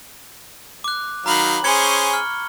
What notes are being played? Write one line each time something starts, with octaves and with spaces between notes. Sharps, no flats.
D6 F#6
D#3 F#3 F5 A#5 B5 F#7
C#4 G#4 C5 G#6 C#7 G7
C#6 G7
F6